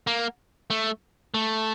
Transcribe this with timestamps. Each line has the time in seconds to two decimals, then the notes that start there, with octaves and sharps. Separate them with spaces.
0.07 A#3
0.70 A3
1.34 A3